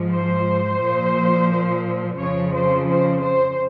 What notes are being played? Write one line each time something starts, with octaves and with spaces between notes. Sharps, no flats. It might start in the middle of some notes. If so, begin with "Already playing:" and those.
Already playing: G#2 F3
C5
A#2 F3
F2 C#3 F3 C#5
C5
C5
C5